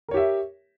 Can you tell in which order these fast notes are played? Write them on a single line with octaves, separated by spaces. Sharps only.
A#4 C#5 G4 E5